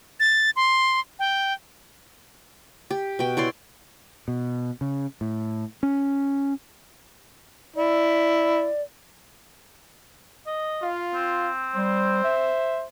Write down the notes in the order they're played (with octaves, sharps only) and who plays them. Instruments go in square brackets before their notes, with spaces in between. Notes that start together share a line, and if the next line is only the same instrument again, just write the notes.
[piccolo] A6
C6
G5
[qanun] G4
B2 G5
E4 C#5 D5 C6
[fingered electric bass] B2
C#3
A2
C#4
[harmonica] E4 [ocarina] D5
[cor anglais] D#5
[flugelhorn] F4 [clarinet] F5
[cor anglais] C4
[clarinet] G3 [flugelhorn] C5
[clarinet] E5